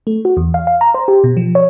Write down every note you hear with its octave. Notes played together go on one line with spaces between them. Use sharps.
A3
F#4
E2
F5
F5
A#5
C5
G4
B2
F3
C#5